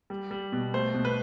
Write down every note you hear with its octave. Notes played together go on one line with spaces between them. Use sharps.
G3
G3
B2
A3 C5
B2
B4